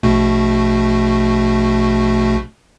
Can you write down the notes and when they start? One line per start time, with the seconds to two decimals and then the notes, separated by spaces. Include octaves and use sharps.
0.03 A#1 B2 A3